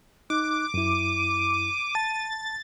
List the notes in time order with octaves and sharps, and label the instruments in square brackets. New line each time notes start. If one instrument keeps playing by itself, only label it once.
[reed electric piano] D#4 [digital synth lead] D6 [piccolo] F#6
[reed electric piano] F#2 E4 [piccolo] D#7
[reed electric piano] A5 [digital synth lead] A6